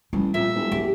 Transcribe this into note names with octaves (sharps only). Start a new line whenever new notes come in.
A1 G3
F2 A#2 E5
E1
F#3 G4